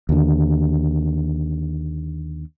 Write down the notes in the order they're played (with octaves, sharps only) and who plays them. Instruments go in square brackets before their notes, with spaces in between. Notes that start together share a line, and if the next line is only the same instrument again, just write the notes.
[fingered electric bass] D#2 D3